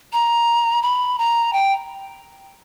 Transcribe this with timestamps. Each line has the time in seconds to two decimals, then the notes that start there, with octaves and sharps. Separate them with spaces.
0.13 A#5
0.82 B5
1.19 A#5
1.53 G5